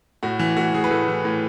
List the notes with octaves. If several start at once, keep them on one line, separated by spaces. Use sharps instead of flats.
A2 F#4
E3
A2 F#4
E3 G#4
B4
A2 A4
E3
A2